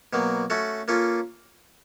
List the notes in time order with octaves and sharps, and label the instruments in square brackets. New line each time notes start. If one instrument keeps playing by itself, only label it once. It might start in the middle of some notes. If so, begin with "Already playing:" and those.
[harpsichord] B2 F#3 A#3
A3 C#4 F#4 A4
A#3 C#4 F4 A4